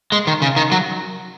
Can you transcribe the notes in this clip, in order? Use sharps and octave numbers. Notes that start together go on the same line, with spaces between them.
G#3
D#3
C#3
D#3
F#3